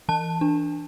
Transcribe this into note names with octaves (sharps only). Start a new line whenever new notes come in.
E3 A5
D4